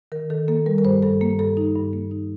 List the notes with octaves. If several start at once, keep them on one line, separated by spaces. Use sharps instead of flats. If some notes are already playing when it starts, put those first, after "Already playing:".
D#3 A#4
D#3 A4
A#3 A4
G3 A#4
A#4
G2 C5
G2 A4
A#3
G2 A4
D#4
G2
A#3
D#4